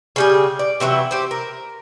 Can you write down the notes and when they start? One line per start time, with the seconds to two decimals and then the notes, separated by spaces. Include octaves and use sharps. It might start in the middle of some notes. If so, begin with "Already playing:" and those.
0.16 C#3 G3 G#4
0.59 D5
0.80 C3 E3 F#3 E5
1.11 G4 C5
1.31 A#4